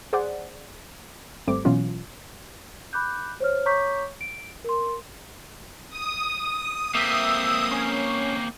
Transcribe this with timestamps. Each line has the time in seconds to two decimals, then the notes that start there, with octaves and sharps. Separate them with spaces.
0.13 G#4 C5 D5 F#5
1.47 G#1 G3 A3 C4 D6
1.65 B2 E3 F#3 C#4 F4
2.93 B5 D6 F#6 G6
3.40 C5 C#5 F6
3.66 C#5 A#5 C#6 D6 G6 B6
4.21 D7
4.64 A#4 C6
5.89 D#6
6.95 A#3 C4 E5
7.71 C#4